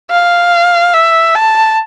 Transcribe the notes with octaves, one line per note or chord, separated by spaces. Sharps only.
F5
E5
A5